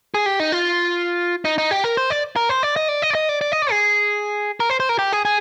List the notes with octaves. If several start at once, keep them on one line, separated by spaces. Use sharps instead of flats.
G#4
G4
D#4
F4
D#4
D#4
G4
A#4
C5
D5
A#4
C5
D5
D#5
D5
D#5
D5
D#5
D5
D5
D#5
D5
G#4
A#4
C5
C5
A#4
G4
G#4
G#4